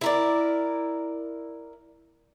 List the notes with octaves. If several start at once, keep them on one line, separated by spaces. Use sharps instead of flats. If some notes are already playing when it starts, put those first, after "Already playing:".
E4 A#4 D5